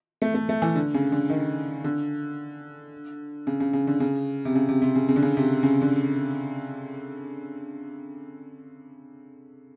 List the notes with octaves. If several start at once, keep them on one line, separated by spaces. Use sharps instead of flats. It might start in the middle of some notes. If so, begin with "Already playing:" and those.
A3
A3
A3
E3
D3
C#3
D3
D#3
D3
C#3
C#3
C#3
D3
C#3
C3
C#3
C3
C3
C#3
C#3
D3
C#3
C3
C#3
D3